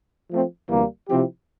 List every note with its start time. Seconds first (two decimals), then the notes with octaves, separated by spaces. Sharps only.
0.30 F3 A3 C4
0.69 D2 C3 E3 G3 A#3
1.08 C3 F3 C4 E4 G4